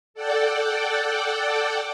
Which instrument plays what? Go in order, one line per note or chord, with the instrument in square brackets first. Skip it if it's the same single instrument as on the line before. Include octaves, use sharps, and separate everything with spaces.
[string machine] A4 D5 F#5 G5